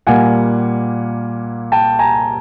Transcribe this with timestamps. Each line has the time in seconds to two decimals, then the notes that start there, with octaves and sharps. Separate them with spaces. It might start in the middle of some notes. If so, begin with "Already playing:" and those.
0.07 A#2 G3 A#3 F#5 G#5
1.72 G5 A5
1.99 G#5 A#5